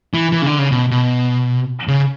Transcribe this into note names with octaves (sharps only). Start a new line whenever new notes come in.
E3
E3
C#3
D3
C#3
B2
B2
C#3